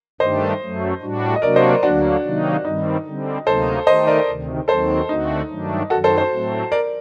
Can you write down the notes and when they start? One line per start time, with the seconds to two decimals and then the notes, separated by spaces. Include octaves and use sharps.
0.20 G2 D#3 A3 D4 G4 C5 D#5
0.61 F#2 F#3 A3
1.02 A2 G3 D4 F#4
1.36 D#5
1.42 C3 F#3 A#3 D4 F#4 A#4 D5
1.56 C5 D#5
1.69 A#4 D5
1.83 D2 D3 F#3 A#3 D4 F#4
2.24 C3 D#3 F#3 A#3 D#4
2.64 G2 D#3 G3 C4 D#4
3.05 D3 G3 C4
3.47 D2 C3 F#3 A#3 D#4 A4 C5
3.86 D#3 A3 D#4 G4 C5 D#5
4.07 A#4 D5
4.27 D2 C3 D#3
4.68 D#2 D#3 F#3 C4 A4 C5
5.09 D2 D3 A3 C4 D#4 F#4
5.49 G2 D#3 F#3 A3 D4
5.90 F#2 D#3 F#3 F#4 A4
6.04 A4 C5
6.17 A4 C5
6.31 A2 F#3 A3 C4
6.72 A#4 D5